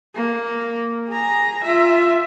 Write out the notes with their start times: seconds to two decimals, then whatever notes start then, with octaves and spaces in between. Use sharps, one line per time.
0.15 A#3
1.09 G#4 A#5
1.64 F4 E5